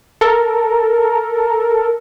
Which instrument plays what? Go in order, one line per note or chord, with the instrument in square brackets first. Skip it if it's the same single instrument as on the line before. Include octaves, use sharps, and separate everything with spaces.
[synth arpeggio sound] A4 A#4